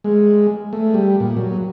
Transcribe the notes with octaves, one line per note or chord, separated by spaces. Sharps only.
G#3
A3
G3
A#2
F#3